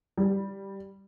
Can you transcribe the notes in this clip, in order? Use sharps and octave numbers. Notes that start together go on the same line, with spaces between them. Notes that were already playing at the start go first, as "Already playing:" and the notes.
G3